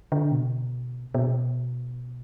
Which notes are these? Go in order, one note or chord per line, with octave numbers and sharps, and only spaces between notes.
D3
B2
B2